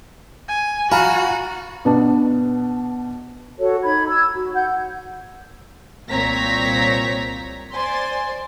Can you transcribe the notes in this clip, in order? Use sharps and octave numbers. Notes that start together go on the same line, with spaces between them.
G#5
F4 F#4 G#5 A#5 B5
B2 B3 D4
F#4 A4 C#5
D#4 B5 G#6
E6 G#6
F#4
F#5 G6
C2 A#2 C4 C#5 A#5 B6
C5 D5 G#5 C6